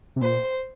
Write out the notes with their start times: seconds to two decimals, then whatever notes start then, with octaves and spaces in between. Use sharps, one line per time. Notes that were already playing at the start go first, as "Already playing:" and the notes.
0.16 C3
0.21 A#2 C5